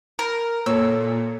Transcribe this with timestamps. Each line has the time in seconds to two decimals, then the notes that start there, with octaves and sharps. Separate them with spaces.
0.19 A#4
0.66 A#2 A4 C#5 E6